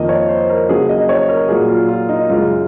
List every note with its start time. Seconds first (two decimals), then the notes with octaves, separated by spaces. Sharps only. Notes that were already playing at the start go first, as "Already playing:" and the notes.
Already playing: F2 D#3 A#3 D#5
0.09 C#5
0.29 C5
0.49 A#4
0.69 C#3 F#3 A#3 G#4
0.89 D#5
1.09 C#5
1.29 A#4
1.49 A#2 F#3 A#3 G#4
1.69 F4
1.89 F4
2.09 D#4
2.29 F#2 C#3 G#3 F4